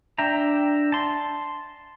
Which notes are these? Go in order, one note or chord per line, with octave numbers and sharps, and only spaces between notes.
D4 E5 G5 A#5
A5 C6